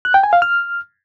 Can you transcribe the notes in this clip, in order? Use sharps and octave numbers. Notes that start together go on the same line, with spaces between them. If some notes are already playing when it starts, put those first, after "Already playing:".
F#6
G5
G#5
F5
F6